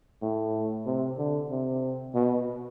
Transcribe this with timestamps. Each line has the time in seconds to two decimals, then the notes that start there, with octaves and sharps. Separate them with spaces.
0.22 A2
0.86 C3
1.18 D3
1.50 C3
2.15 B2